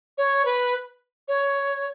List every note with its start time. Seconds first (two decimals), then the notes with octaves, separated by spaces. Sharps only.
0.18 C#5
0.45 B4
1.28 C#5